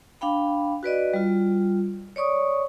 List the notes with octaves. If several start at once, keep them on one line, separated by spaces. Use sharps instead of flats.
D4 F5 G5 B5
F#4 B4 D5 D#5
G3 F4
C#5 D5 C#6 D#6